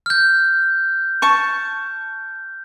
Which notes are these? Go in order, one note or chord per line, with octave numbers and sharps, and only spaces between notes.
F6 G6
A5 C#6